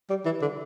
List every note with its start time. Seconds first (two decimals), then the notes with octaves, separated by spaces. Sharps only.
0.10 G3
0.25 E3
0.42 D3